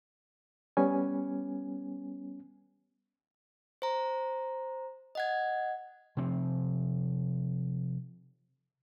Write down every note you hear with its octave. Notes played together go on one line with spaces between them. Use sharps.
G3 B3 C#4 G#5
C5 A#5
D#5 F#5 G#6
C3 F3 C4